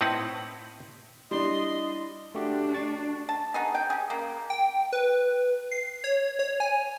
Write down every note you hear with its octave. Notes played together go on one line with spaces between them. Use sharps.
A2 C4 D#4 E4 B4 F#5
G3 D4 E4 D#5 C6
A3 D4 F#4 G4
C#6 A6
A5
B3 D#4 G#4
G5
G4 G#4
C#3 A#3
G5
B4
C7
C#5
C#5
G#5